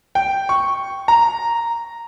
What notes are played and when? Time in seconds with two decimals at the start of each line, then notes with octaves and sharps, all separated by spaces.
0.15 G5
0.49 C#6
1.08 A#5